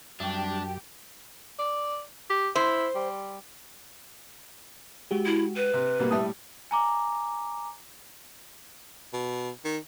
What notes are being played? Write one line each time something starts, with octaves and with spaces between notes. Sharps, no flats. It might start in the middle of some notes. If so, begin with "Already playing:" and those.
F#2 G3 D4 G4 E5
D5
G4
E4 C5
G3
G#3 F#4 G4
E4
B4
C3
B2 G3 A#3
A2 G3 E5 A5 D#6
G#5 A#5 D6
B2
D#3